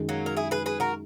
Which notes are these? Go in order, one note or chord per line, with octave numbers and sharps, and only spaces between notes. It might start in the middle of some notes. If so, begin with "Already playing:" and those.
Already playing: F#2 D#3 G#3
F#3 A#3
A#4
E4 G#4
G#4 B4
G#4 B4
F#4 A#4